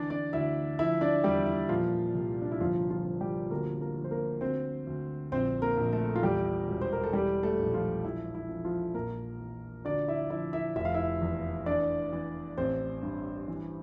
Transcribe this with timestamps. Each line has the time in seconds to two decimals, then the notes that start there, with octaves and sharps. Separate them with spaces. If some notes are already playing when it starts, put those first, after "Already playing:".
Already playing: D2 E3 D4 D5
0.10 D4 D5
0.33 D2 E4 E5
0.79 F3 E4 E5
1.01 D4 D5
1.24 E2 G3 G4
1.46 E4
1.69 A#2 F3 F4
2.15 C2
2.42 D4
2.51 E4
2.60 G1 F3 F4
2.90 F3 F4
3.06 F3
3.21 G3 G4
3.51 D2 A#3 A#4
3.81 A#3 A#4
3.97 F3
4.04 C5
4.11 A#3 A#4
4.41 D2 C4 C5
4.87 D2
5.32 A#1 C4 C5
5.62 A#3 A#4
5.77 A#1
5.93 A3 A4
6.16 F4
6.23 E2 G3 G4
6.68 E1
6.81 C5
6.93 A#4
7.03 A4
7.13 E3 G3 G4
7.43 A3 A4
7.59 A#1
7.73 F3 F4
8.04 F3 E4
8.34 E4
8.49 F3
8.65 F3 F4
8.94 A#1 A#3 A#4
9.40 E3
9.85 D2 D4 D5
10.08 E4 E5
10.30 F3 E4 E5
10.53 E4 E5
10.76 F1 E5
10.85 F5
10.94 E4 E5
11.21 E2
11.66 E3 D4 D5
12.12 E3
12.57 A1 C4 C5
13.03 G2
13.48 E3